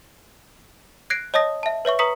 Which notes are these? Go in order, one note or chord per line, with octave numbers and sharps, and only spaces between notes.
F#6 G#6 A#6 C7 D7
C#5 D#5 A5 D#6 A#6
E5 A5
B4 C#5 E5 C#6
B4 A#5 C#6 D#6 B6 C#7